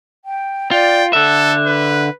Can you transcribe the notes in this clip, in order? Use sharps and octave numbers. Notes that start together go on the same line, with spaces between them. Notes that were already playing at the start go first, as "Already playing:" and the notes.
G5
F4 D5 G5
D3 A4 E5 F#6
B4